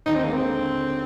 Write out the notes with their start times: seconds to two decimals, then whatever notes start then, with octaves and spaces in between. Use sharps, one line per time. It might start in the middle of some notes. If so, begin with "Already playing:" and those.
0.06 D#2 D#4
0.15 C4
0.24 G#3 A#3
0.33 C4
0.42 D3